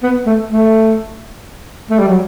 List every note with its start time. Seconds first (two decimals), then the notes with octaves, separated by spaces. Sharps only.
0.03 B3
0.26 A3
0.50 A3
1.90 A3
1.99 G3
2.08 F#3